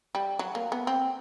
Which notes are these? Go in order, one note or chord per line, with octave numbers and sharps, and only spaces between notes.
G3
F#3
A#3
B3
C4